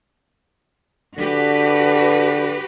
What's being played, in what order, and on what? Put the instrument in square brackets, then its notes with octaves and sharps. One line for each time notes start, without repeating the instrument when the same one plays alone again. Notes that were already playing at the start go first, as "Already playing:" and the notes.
[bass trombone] D3 [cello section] F#4 G4 B4